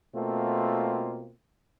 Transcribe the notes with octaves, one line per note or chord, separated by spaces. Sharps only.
B2 A3 A#3 C4 F4